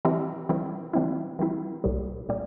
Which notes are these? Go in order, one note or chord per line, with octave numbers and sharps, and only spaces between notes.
E3 G3 C4 E4
E3 G3 C4 E4
E3 G3 C4 E4
E3 G3 C4 E4
C2 A#2 G3
A#2 G3